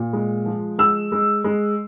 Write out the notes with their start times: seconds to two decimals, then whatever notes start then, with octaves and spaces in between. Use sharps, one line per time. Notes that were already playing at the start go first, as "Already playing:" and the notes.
Already playing: A#2
0.13 G#3
0.46 F3
0.78 G#3 E6
1.12 G#3
1.44 G#3